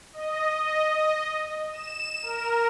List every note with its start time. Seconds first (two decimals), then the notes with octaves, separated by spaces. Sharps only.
0.13 D#5
1.71 E7
2.22 A#4